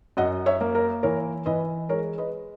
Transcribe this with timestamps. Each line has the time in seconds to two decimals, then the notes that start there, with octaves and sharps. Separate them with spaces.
0.17 F#2 D#5 F#5
0.46 C#5 E5
0.61 A#3
0.75 A#4
1.03 E3 A#4 C#5
1.46 E3 B4 D#5
1.89 G#3 A#4 C#5
2.18 B4 D#5